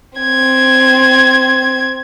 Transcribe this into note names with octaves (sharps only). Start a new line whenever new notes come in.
C4 G#6